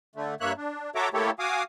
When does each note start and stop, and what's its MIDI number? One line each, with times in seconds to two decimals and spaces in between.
0.16 0.34 50
0.16 0.34 57
0.41 0.53 43
0.41 0.53 58
0.41 0.53 73
0.41 0.53 76
0.41 0.53 90
0.57 0.90 62
0.95 1.09 66
0.95 1.09 69
0.95 1.09 73
0.95 1.09 76
0.95 1.09 82
0.95 1.09 86
1.14 1.31 57
1.14 1.31 58
1.14 1.31 64
1.14 1.31 67
1.14 1.31 69
1.14 1.31 73
1.39 1.63 66
1.39 1.63 77
1.39 1.63 80
1.39 1.63 86
1.39 1.63 87